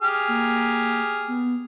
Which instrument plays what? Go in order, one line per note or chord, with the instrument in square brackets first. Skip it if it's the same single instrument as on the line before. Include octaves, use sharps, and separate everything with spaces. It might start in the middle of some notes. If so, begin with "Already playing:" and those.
[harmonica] G4 G#4 F6
[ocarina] A#3
B3